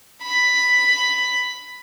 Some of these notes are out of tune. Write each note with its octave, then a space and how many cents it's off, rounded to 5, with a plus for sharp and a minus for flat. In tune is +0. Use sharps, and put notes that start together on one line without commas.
B5 +5